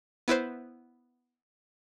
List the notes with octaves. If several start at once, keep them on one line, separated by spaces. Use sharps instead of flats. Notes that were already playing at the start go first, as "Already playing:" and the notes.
B3 E4 B4 C5